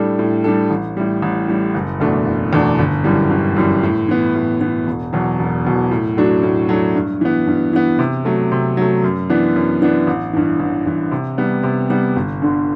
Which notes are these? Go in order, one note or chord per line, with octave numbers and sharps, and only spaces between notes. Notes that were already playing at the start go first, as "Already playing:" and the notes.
Already playing: A2 G3 D4 A4
A2
G3 D4 A4
A1
A2 G3
A1
A2 G3
F#1
E2 B2 A3 D4
F#1
E2 B2 A3 D4
G1
F#2 E3 G3
G1
F#2 E3 G3
A2
E3 B3
A2
E3 B3
E1
E2 B2 F#3
E1
E2 B2 F#3
A2
F#3 A3 D4 F#4
A2
F#3 A3 D4 F#4
G2
E3 B3
G2
E3 B3
C3
F#3 A3
C3
F#3 A3
F#2
E3 B3 D4
F#2
E3 B3 D4
A1
G2 E3
A1
G2 E3
C3
G3 B3
C3
G3 B3
G1
G2 D3